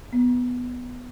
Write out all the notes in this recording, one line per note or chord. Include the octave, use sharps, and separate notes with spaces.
B3